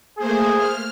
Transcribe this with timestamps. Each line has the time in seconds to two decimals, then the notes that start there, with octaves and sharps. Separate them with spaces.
0.18 A3 A#3 G#4 C5
0.56 F6